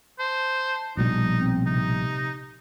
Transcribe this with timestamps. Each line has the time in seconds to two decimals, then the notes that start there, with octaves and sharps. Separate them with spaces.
0.19 C5 A5
0.97 A#1 B2 G3 D#4
1.40 C4
1.66 C3 D#4